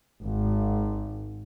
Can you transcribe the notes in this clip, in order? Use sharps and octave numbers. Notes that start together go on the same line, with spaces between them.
G#1